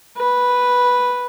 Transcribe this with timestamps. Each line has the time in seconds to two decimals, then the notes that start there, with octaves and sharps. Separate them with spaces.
0.17 B4